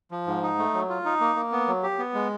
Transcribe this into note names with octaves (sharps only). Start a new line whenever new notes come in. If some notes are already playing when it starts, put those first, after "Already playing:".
F3
G#2
D#4
A3
F#3
F4
D#4
A#3
A#3
B3
F#3
G4
B3
G#3